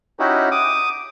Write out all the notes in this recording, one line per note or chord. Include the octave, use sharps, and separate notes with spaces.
C#4 D#4 E4 F#4 G4
D6 D#6